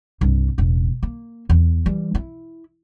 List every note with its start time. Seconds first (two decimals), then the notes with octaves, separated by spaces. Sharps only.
0.21 C2 G2
0.58 E1 A1
1.03 A#3
1.50 E2
1.86 E3 G3
2.15 E4